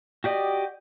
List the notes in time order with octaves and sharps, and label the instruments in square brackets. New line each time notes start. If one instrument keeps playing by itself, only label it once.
[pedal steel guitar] F#4 G4 D5 D#5